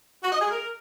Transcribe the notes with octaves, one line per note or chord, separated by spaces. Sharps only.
F#4
D#5
G#4
A#4